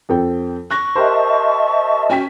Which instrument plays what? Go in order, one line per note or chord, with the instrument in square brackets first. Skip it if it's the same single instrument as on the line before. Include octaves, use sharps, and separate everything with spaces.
[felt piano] F2 A4 G5
[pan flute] C#6 [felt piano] F#6 A#6
[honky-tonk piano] G4 A#4 C5 [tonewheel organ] D#5 E5 A5
[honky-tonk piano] C#4 G5 B6 [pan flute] F#4